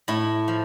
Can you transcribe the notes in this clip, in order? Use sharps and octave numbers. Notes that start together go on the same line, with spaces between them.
A2 E4
F3